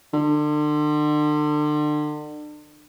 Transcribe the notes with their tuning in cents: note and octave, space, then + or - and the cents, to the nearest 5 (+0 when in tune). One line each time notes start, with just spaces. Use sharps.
D3 +35